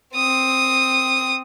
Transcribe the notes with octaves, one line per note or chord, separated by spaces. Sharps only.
C4 D#6